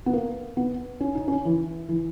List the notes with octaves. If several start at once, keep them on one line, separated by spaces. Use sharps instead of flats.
B3
A#3
B3
C#4
D#4
C#4
E3
E3